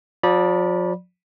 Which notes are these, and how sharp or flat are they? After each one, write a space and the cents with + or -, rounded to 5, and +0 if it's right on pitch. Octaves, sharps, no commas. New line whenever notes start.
F3 +45 D5 +0 B5 -25